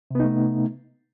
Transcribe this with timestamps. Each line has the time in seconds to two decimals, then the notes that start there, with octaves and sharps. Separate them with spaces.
0.11 C3
0.15 B3
0.20 D#4
0.24 A3